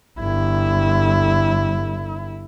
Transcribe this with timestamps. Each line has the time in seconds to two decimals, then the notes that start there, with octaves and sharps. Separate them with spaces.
0.20 G1 E4